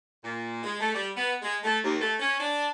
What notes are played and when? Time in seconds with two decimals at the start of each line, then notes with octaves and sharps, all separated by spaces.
0.24 A#2
0.63 G#3
0.80 A3
0.94 G3
1.16 B3
1.42 G#3
1.63 A3
1.83 D#2
2.00 A3
2.19 C#4
2.39 D4